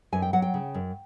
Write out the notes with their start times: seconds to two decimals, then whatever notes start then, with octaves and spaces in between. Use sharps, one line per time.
0.12 F#2 G#5
0.22 G5
0.33 F#3 F#5
0.42 G5
0.54 C#3
0.74 F#2